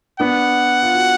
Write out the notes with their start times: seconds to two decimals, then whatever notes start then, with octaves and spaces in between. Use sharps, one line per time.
0.20 B3 D4 F#5
0.83 F4
0.95 F#4